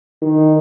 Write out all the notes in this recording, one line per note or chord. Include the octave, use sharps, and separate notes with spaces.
D#3